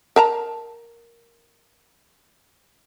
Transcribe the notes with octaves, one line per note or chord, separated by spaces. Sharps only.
A#4 A5 A#5